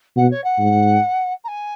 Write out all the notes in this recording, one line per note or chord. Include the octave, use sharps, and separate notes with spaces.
B2 F#5
C#5
F#5
G#2
A#5
G#5